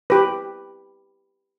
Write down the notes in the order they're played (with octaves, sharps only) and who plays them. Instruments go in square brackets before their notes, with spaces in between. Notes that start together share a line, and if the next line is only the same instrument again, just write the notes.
[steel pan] G4 B4